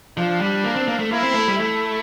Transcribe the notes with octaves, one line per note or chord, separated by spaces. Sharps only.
F3 D4
G3
A#3
C4
A#3
A3
A#3 E4
C4
A3
G3
A3 E4